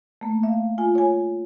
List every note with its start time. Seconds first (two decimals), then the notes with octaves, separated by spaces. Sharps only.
0.21 A3 A#3
0.43 E5 F5
0.78 F4 G#5
0.95 C#5 G#5